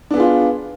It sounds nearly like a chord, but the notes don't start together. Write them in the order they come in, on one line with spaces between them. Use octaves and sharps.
D4 B3 G#4 F4